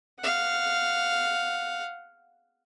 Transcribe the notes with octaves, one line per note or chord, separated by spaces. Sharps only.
F5 F#5